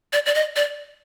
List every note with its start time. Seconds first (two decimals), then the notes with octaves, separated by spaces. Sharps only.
0.13 D5
0.26 D5
0.35 D#5
0.56 D5